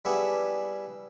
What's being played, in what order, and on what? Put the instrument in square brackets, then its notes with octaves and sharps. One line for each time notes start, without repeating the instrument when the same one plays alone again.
[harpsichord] G3 B3 D4 E4 G#4